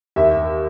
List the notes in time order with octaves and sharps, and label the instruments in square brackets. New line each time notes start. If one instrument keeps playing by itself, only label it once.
[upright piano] D#2 E5